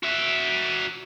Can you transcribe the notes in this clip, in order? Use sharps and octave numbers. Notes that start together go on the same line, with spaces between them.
F#4 E5